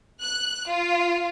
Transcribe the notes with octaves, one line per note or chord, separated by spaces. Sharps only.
F#6
F4